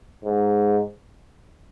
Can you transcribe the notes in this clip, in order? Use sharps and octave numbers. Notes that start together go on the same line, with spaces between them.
G#2